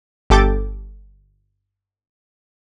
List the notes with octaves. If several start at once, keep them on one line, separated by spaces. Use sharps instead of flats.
G1 G4 A4 D6 G6 A6